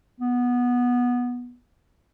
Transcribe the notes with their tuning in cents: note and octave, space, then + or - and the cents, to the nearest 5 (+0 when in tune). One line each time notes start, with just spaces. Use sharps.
B3 -10